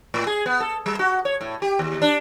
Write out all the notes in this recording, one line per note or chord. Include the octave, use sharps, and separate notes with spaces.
A2
G#4
B3
A4
G3
F#4
C#5
A2
G4
D#2
D4